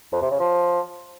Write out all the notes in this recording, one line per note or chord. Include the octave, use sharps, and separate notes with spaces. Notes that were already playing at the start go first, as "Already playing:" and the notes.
F2
C3
C#3
F3